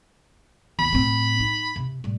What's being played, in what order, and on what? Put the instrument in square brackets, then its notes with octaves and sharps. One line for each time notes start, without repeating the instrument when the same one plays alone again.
[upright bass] D#2 [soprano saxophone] B5
[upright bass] A2 C4
D#4
C3
A2 G3